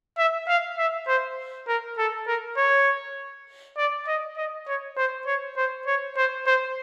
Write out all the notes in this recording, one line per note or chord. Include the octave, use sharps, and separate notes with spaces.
E5
F5
E5
C5
A#4
A4
A#4
C#5
D5
D#5
D#5
C#5
C5
C#5
C5
C#5
C5
C5